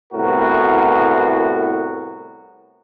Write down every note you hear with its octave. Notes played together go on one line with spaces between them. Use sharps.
C2 A2 B3 F#4 A#4